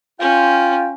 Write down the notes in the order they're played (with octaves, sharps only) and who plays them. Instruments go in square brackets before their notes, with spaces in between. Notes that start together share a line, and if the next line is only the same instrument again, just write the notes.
[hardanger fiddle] C#4 [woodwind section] F4 G5